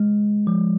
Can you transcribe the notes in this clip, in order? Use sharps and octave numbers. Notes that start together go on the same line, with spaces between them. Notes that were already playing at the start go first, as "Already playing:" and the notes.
Already playing: G#3
F3